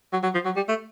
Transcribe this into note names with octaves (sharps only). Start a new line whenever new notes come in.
F#3
F#3
F3
F#3
G3
A3